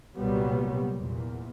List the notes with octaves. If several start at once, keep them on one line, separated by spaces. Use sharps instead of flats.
C2 A#2 F#3 G3 B3
E2 A#2